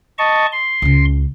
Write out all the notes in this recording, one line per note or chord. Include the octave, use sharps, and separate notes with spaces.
D#5 A5 C#6
C6
C#2 C#3